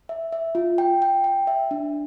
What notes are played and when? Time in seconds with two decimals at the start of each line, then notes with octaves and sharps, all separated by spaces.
0.09 E5
0.32 E5
0.55 F4
0.78 G5
1.02 G5
1.24 G5
1.47 E5
1.71 D4